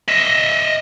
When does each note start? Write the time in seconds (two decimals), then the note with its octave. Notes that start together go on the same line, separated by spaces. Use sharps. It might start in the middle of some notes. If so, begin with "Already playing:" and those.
0.08 D#5 E5